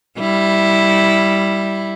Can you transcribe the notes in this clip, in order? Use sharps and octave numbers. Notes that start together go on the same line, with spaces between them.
G3 E4